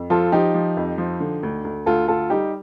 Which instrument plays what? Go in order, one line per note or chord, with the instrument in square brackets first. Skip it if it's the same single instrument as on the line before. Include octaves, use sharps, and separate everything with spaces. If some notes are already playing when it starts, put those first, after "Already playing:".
Already playing: [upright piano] F2
[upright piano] F3 [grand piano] F4 A4
[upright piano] F3 [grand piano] D#4 G4
[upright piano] F3
F2
F3
D3
D2
D2
[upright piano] D2 [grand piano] F4 A4
[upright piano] D2 [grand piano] F4 A4
[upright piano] G3 [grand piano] D#4 G4